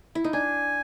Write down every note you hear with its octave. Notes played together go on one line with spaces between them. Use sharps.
E4
D#4
D4 G#5